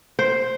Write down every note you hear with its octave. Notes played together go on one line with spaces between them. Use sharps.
C5